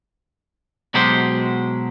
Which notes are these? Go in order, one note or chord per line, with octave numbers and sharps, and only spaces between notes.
B2 F#3 G#3 G4 C5